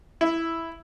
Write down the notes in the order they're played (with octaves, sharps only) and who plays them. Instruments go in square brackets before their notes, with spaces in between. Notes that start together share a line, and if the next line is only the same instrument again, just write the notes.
[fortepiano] E4